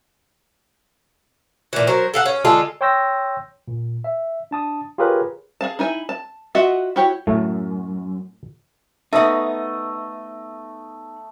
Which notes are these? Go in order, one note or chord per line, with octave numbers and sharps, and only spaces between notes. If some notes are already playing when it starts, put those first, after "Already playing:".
A#2 E3
F#3 A#4 C5
A4 F5 F#5
C#4
D3 G#3 F4 A4
C#5 G5 C6 E6 G6 A#6
A#2
E5
D4 A5 D#6
F4 G4 G#4 A#4 B4 C#5
G#4 F5 A5
D#4 E4 G#5
A5
F4 F#4 D#5 E5 F#5
E4 F#4 G4 C#5
F#2 A2 A3
A3 B3 D#4 D#5 E5 D#6